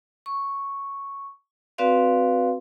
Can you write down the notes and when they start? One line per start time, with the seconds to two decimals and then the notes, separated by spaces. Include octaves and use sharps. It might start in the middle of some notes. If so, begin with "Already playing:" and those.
0.26 C#6
1.78 C4 F#4 B4 D5 F5 C6